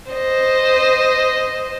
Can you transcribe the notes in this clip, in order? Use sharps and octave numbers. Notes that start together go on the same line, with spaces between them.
C5 D#5